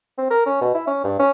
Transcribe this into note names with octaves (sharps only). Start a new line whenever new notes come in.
C4
A#4
C#4
B2
E4
C#4
G2
C#4